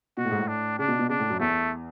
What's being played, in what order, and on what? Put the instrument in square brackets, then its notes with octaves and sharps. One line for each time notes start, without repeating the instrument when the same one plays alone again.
[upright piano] B2 [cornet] F#4
[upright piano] A2
G#2
A2
[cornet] D4
[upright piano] C#3 [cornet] D4
[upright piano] B2
B2
[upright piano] C#3 [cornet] D4
[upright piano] A2
F#2
[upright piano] E2 [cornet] A3